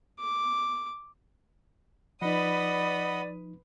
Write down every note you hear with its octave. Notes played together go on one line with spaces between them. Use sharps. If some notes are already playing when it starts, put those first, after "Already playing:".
D6
F3 D#4 B4 D5 D#5 F#5 B5 D#6